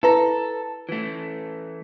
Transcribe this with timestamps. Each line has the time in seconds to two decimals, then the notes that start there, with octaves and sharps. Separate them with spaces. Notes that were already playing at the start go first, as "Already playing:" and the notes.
0.03 E4 A4 B4 A#5
0.89 E3 A3